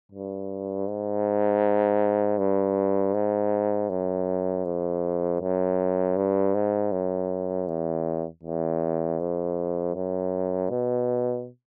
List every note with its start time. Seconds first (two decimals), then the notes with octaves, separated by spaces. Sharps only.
0.12 G2
0.87 G#2
2.38 G2
3.14 G#2
3.89 F#2
4.65 F2
5.41 F#2
6.17 G2
6.55 G#2
6.92 F#2
7.68 E2
8.43 E2
9.20 F2
9.95 F#2
10.70 B2